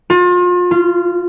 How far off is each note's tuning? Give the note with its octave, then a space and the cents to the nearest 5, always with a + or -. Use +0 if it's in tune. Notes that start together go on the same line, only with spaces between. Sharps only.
F4 +35
F4 -20